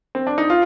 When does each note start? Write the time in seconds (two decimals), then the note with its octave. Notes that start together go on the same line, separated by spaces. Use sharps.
0.15 C4
0.27 D4
0.38 D#4
0.50 F4